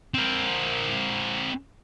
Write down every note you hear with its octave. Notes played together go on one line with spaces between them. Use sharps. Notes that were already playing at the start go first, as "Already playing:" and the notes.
C4 A#4